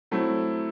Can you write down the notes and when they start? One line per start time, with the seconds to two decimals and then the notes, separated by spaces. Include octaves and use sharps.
0.11 F#3 A3 C4 E4